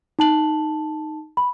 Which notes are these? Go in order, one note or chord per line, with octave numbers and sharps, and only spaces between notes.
D#4 A5 F#7
B5